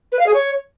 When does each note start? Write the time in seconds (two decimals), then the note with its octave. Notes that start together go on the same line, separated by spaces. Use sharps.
0.12 B4
0.19 F5
0.26 G#4
0.34 C#5